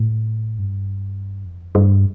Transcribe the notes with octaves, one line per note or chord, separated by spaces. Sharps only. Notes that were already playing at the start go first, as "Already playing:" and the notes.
Already playing: A2
G2
F2
G2